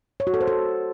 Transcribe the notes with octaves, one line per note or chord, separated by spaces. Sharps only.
C#5
F#4
A4
C5
A4